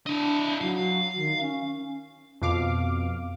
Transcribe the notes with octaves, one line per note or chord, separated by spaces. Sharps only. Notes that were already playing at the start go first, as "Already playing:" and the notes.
D4 E4 D#5
F#3 F5
D#3
C#4
F2 B2 F5 D6